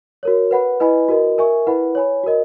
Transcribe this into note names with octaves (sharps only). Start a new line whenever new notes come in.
F#4 A#4 C#5
B4 F#5 B5
E4 B4 D#5 G#5 B5
F#4 A#4 D#5
A#4 E5 G#5 C#6
E4 B4 F#5 B5
C#5 G#5 B5
F#4 A#4 D#5